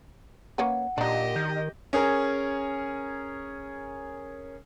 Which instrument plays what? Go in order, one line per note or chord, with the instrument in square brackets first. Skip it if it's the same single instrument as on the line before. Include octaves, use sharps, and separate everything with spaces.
[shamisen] A#3 C#4 B4 [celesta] F#5
[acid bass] A#2 [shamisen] D4 D#4 [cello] G4 D#5
[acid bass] D#3 [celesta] G6
[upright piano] C#4 G#4 A#4